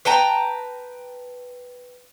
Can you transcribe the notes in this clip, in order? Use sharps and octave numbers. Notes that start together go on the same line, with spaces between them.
B4 G5 A5 A#5